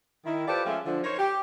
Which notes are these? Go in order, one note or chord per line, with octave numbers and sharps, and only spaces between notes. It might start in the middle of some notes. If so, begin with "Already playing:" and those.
D#3 E4
F4 G4 A4 B4 C5 D5
F3 G#3 A3 C#4 E5 F5
D3 F3
D#4 A#4 C5 C#5
G4